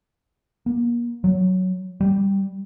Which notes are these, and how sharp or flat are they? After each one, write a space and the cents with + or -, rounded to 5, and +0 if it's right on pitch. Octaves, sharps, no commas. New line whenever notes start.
A#3 +35
F#3 +5
G3 +0